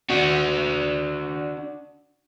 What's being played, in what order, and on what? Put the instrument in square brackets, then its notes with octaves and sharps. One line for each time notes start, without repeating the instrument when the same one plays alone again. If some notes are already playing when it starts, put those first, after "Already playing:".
[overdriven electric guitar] D4 F#4